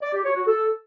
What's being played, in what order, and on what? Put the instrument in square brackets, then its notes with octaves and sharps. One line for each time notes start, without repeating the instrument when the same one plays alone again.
[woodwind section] D5
G4
C#5
F#4
A4